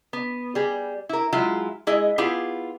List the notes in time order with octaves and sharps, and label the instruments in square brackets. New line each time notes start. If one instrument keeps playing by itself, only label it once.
[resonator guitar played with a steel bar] B3
G3 G#4
E4 A#4
F#3 G#3 E4 F4
G#3 E4 G#4 D#5
B3 E4 F4 G4 G#4